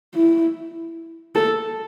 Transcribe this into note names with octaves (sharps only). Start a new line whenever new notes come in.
E4
A4